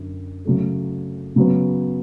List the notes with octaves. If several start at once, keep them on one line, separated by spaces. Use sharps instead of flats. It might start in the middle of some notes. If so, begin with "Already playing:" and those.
Already playing: F#2 D3
C#3 F#3 A3
C#3 F#3 B3